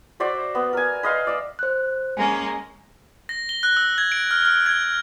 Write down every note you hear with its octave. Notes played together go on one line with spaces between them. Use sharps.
F#4 C5 D5 E5
B3
A#4 G#5
B4 D#5 F5 C6
D5 E5
C5 F#6
G#3 A#3 C#4 G#5
A#6
G7
F#6
E6
G#6
D7
F6
F6
G#6